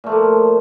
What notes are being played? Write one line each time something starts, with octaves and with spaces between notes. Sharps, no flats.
A#2 F3 A3 A#3